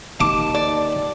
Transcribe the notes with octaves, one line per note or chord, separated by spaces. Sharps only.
D#2 A5 D6
D5